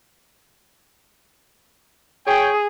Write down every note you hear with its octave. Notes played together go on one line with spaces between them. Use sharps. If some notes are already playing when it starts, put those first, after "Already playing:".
G#4 C#5 G5